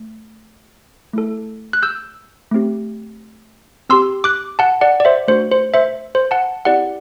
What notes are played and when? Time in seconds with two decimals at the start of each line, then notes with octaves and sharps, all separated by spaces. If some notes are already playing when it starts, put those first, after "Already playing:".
Already playing: A3
1.13 A3 E4 A4
1.73 F#6
1.82 E6 G6
2.51 A3 C4 G4
3.89 C4 G4 C6 E6
4.24 D6 F#6
4.59 F#5 A5
4.81 D5 F#5
5.00 D5
5.05 C5 E5
5.28 A3 D4 F#4 C5
5.52 C5
5.74 C5 E5
6.15 C5
6.31 F#5 A5
6.65 C4 E4 G4 D5 F#5